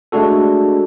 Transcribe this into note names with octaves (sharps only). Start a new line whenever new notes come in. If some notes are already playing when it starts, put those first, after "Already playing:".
G#3 A3 D4 F#4 A4